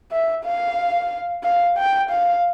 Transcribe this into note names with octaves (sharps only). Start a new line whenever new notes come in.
E5
F5
F5
G5
F5